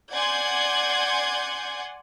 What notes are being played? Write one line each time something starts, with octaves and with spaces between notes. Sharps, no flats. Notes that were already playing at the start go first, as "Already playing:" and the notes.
D5 F#5 G#5 C6 G6 G#6